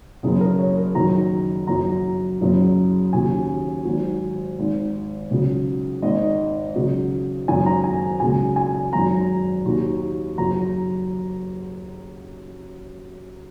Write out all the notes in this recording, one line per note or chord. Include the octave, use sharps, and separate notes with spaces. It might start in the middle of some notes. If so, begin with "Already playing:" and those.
F#1 F#2 C#3 G#4
A#4
C#5
A#4
F#1 F#2 D#3 F#3 A#5
F#1 F#2 F#3 A#5
F#1 F#2 C#3 F#3
D#2 C#3 F#3 G#5
G#1 G#2 F#3
G#1 G#2 D#3
C#2 C#3 F#3
G#1 G#2 D#3 D#5
C#2 C#3 F#3
G#1 F#2 C#3 F#3 G#5
A#5
G#5
C#2 C#3 F#3 G#5
G#5
G#1 F#2 F#3 A#5
D#2 D#3 F#3
F#1 F#2 F#3 A#5